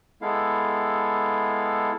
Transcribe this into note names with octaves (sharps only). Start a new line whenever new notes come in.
G#3 B3 E4 A4 F5